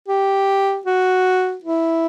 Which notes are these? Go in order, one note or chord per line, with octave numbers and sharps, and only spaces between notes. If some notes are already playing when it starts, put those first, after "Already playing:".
G4
F#4
E4